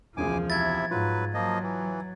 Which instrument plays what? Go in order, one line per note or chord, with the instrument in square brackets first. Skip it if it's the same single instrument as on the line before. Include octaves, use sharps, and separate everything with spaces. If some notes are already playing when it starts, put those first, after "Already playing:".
[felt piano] E1 C#2 G#4 [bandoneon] F#2 G#5 D6 [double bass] F3
[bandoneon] C3 E4 E5 [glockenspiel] G#6 A6
[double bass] G#2 [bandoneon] F#3 B4 [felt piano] F4
[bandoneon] F3 A#3 D#5 [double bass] F#3
[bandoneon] E3